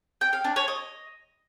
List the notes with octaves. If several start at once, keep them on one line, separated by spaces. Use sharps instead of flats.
G5
F5
D4
C#5
D#5